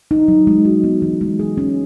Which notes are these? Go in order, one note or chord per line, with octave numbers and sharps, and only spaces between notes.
D#4
F#3
G#3
F#4
B3
E3
G#3
G#4
C#4